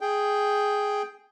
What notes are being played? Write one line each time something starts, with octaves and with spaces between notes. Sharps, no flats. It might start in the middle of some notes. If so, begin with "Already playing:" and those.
G#4 G5